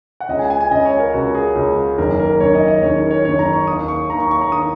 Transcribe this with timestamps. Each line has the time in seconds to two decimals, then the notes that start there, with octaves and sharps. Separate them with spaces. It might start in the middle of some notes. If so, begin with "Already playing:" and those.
0.20 F#5
0.28 C#2 C#3 D#5
0.39 G#5
0.50 G#5
0.61 G#5
0.71 C#2 C#3 D#5
0.85 C#5
1.00 A#4
1.13 C#2 C#3 F#4
1.35 G#4
1.55 C#2 C#3
1.98 F#1 F#2 D#3 A#4
2.19 A#4
2.40 F#1 F#2 D#3 C#5
2.55 D#5
2.68 D#5
2.83 F#1 F#2 D#3 C#5
3.06 A#4
3.11 C#5
3.25 F#1 F#2 D#3 C#5
3.39 A#5
3.53 C#6
3.67 D#2 D#3 D#6
3.88 C#6
4.10 D#2 D#3 A#5
4.20 C#6
4.31 C#6
4.41 A#5
4.52 D#3 D#6